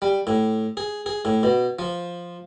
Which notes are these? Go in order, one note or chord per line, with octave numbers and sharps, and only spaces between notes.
G3
A2
G#4
G#4
A2
B2
F3